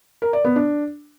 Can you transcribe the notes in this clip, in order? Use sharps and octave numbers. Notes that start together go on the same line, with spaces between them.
A#4
D5
B3
D4